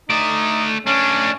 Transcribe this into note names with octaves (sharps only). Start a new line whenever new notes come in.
A3 D#4 D5
A2 C#4 D4